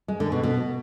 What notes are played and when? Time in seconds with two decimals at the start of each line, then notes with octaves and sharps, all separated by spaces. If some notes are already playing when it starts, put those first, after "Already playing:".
0.08 G#3
0.20 D3
0.32 B2
0.43 B2